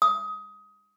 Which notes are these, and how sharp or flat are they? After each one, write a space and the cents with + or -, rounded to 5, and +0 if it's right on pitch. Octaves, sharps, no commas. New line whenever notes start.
D#6 +20